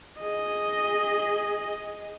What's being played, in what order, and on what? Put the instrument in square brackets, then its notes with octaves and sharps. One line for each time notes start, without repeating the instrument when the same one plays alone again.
[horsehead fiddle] G#4 [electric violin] D#5